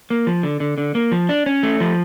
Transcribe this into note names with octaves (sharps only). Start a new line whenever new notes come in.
A#3
F3
D3
D3
D3
A#3
F3
D4
C#4
A3
F3